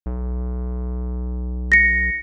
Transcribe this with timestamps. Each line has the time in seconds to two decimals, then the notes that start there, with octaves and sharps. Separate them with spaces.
0.06 B1
1.72 A#6 C#7